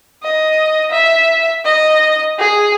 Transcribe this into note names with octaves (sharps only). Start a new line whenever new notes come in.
D#5
E5
D#5
G#4